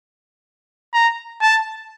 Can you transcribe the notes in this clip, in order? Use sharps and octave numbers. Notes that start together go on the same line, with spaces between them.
A#5
A5